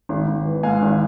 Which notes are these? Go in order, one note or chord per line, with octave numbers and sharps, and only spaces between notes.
G#1
G#1
E3
G#2 F5 G#5
G#1